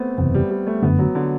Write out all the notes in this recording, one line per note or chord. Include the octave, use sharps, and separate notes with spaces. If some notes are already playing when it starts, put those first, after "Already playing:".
Already playing: A3 B3 C4
F#1 E2 C3 E3 B3
G3
G3
A3
G1 F#2 D3 A3 B3
F#3
D3